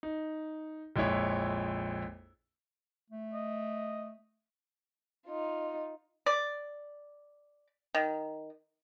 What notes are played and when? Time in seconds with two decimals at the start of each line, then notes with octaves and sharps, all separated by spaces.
0.03 D#4
0.96 A#1 F2 G#3 E4 C#5
3.10 A3
3.33 D#5
5.25 D#4 F4
6.26 D5
7.95 D#3